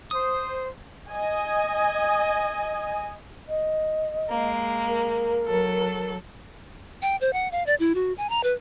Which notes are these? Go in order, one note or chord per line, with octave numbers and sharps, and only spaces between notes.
C5 D#6
D#5 G#5
D#5
G#3 A#3
A#4
F#3 A4
G5
C5
F#5
F5
D5
E4
F#4
G#5
A#5
B4